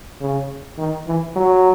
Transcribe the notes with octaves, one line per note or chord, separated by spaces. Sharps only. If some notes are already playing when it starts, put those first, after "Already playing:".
C#3
D#3
E3
F#3